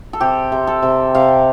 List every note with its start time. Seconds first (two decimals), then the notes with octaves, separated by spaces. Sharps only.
0.13 A4
0.20 C3 G4
0.52 C3
0.67 A4
0.83 C3
1.15 C3 F5